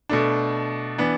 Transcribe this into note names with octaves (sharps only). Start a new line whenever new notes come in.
B2 A3 D4
E3 B3 D4